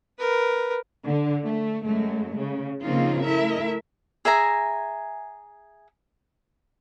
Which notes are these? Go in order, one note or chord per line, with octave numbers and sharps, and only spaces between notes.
A#4 B4
D3
A3
F#2 G#3 A3
C#3
C#3 F3 A#3 C4 D#4 F4
A3 E4 A#4 E5
G#4 E5 G#5 A#5